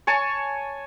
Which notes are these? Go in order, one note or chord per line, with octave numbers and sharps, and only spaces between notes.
C#5 G#5 A5 C#6